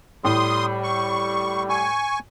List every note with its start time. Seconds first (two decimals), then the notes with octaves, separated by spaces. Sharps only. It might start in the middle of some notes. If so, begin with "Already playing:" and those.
0.25 A2 G3 C6 D#6
0.83 C#6
1.69 G#5 C#6